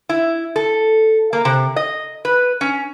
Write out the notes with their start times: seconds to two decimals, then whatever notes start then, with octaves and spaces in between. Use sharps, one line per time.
0.09 E4
0.56 A4
1.33 A#3
1.45 C3
1.76 D#5
2.25 B4
2.61 C#4